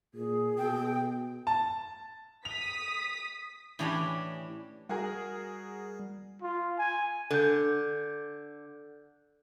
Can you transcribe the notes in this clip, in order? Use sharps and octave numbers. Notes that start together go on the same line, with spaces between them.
A#2 G#4
B2 G5
A5
D#6 B6 F7
A2 E3 C#4 D4 F#4 G4
G3 F#4 G#4 A#4
F4
G#5
D3 A4 G6